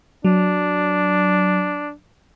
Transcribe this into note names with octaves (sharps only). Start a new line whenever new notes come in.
F#3 D4